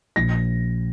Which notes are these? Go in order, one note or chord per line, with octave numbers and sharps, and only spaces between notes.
A#1 A#6